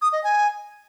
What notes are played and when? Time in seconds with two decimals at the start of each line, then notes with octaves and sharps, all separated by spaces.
0.02 D#6
0.13 D#5
0.24 G#5